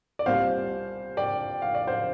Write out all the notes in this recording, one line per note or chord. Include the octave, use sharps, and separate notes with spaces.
D5
C2 A#2 G3 C5 F5
D5 G5
F5
D5
C5 F5